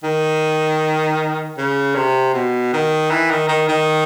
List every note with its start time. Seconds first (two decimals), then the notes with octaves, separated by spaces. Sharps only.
0.03 D#3
1.58 C#3
1.95 C3
2.34 B2
2.73 D#3
3.11 E3
3.30 D#3
3.49 D#3
3.68 D#3